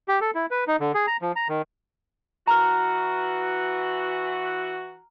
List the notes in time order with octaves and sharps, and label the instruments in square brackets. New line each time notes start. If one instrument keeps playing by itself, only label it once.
[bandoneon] G4
A4
E4
B4
D#4
D3
G#4
A#5
F3
A#5
D#3
[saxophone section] E3 F#4 [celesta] A#5 F6